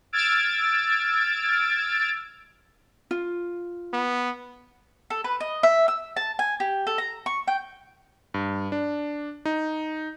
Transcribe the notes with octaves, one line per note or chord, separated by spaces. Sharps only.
E6 F6 G#6 A6 D7
F4
B3
A4
B4
D#5
E5
E6
A5
G#5
G4
A4
A#5
C#6
G5
G2
D4
D#4